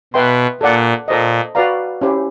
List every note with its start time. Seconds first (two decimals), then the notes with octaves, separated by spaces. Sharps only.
0.14 B2 B4 E5 G5 C6
0.61 A#2 A4 D5 F#5
1.08 A#2 A4 C5 D#5
1.55 F#4 B4 D5 F5 A#5
2.01 C#4 E4 G4 C5